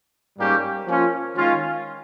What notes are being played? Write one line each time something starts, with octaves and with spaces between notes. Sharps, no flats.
G#2 G3 A#3 C#4 G4
F3 A#3 C#4 F4
D#3 G#3 C#4 F4